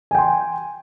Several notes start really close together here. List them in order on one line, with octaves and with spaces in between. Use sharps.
G#5 G5 C6